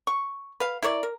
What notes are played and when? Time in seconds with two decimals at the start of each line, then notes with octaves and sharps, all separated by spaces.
0.07 C#6
0.60 B4 F5
0.82 E4 A#4 C#5 D5
1.03 A#4